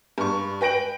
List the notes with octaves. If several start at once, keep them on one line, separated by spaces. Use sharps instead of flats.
G2 C#6
B4 G5 A#6 D7 F#7